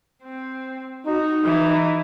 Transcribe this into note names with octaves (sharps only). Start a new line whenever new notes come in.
C4
D#4 F#4
E3